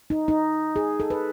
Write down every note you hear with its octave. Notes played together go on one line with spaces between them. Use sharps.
D#4
D#4
G#4
A4
B4